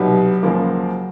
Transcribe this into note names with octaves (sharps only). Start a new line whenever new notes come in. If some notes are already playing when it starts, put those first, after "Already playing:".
Already playing: C2 B2 F#3 G3 B3 D#4
C#2 C#3 F3 A#3